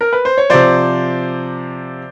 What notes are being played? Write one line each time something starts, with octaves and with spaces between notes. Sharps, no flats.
A#4
B4
C5
C#5
C3 F3 C5 D5